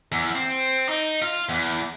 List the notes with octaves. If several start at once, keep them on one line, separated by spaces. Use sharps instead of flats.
E2
C4
D#4
F4
E2